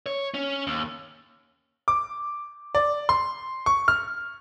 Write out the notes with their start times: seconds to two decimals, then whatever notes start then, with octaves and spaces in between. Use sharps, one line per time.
0.06 C#5
0.34 C#4
0.67 D#2
1.88 D6
2.75 D5
3.09 C6
3.66 C#6
3.88 F6